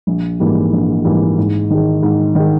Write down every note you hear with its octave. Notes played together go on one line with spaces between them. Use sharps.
A#1
G#2 E3 G3 A#3
A#1
G#2 E3 G3 A#3
G#2
D#3 G#3
G#2
D#3 G#3